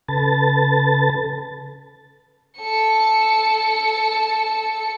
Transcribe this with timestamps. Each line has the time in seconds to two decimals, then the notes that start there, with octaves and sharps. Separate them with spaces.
0.08 C#3 A4 B4 A5 A6
2.59 A4 C#7